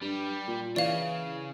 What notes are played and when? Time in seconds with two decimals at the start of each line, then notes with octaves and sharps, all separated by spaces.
0.02 G2 G3
0.48 A#2
0.76 C#3 E3 D5 F5